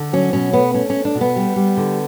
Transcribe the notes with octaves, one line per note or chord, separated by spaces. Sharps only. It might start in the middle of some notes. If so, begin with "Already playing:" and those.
Already playing: D3
F#3 C#4
B2 C#4
A3 B3
A3 C#4
C#4
A3
D4
B2
B3
G3
G3
D3